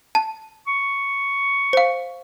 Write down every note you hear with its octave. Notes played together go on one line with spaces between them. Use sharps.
A5
C#6
C5 F5